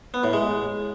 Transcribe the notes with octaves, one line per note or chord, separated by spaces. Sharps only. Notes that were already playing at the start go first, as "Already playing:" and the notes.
B3
A2
G#3